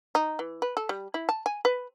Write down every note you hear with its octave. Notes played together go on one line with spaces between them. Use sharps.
D#4
E3
B4
A4
G3
E4
A5
G#5
B4